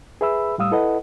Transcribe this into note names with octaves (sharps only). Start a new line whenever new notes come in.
G#4 B4 E5 B5 E6
A2 G3 F5 D#6 E6
E4 A4 B4 D#5 F#5